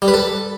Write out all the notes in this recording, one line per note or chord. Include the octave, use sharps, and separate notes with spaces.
G3
B4
A4